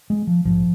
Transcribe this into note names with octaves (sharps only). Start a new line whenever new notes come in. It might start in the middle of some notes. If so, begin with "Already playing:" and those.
G#3
F3
A#1 G#2 F3